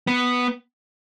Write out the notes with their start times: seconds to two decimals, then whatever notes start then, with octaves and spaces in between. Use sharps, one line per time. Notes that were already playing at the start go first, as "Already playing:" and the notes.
0.07 B3